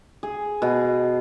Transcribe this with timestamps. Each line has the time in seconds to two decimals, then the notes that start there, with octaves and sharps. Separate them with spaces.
0.23 G#4
0.62 B2